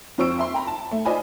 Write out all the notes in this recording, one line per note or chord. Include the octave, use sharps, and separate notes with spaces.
F2 F4 C5 C#6 E6 D7
E5 C6
G5 A#5 B5
A5
A3
F4 C5 D5 D#5 G#5 B5